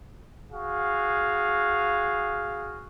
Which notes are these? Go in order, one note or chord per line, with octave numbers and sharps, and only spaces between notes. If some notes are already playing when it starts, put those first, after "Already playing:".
F#4 G#4 F5